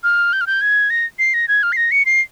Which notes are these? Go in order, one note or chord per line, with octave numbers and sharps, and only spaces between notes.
F6
G6
F6
G6
G#6
A#6
C7
A#6
G#6
F6
C7
A#6
C#7
C7